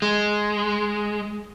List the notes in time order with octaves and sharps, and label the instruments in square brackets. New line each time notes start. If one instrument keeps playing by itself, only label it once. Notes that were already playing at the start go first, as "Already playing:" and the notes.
[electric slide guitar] G#3